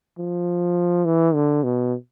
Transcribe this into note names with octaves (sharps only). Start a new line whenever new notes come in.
F3
E3
D3
B2